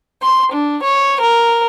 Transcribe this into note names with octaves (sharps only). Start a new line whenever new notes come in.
C6
D4
C#5
A#4